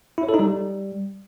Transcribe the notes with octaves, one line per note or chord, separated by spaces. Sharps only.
E4
C#5
A4
D#4
G3